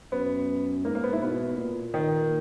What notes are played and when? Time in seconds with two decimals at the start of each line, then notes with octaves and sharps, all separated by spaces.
0.12 F#2 B3
0.85 G#2 A#3
0.95 A#3
1.04 B3
1.13 E4
1.22 B2 B3
1.57 A#2
1.94 D#3